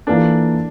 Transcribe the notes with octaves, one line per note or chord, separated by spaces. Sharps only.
E3 A#3 D4 F4 A4